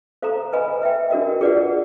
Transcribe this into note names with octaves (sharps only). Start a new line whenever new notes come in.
A4 C5 F5 A#5
B4 D#5 G#5 B5
B4 E5 G5
D4 F#4 A#4 D#5
F4 G#4 B4 D5 F#5